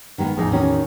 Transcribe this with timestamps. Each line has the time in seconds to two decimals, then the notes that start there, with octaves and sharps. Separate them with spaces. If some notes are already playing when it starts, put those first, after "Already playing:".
0.18 D#3 G#3 B3
0.37 A1 E2 F3 D#4 G#4
0.52 D#3 C#4 F#4